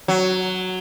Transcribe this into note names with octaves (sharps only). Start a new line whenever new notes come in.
F#3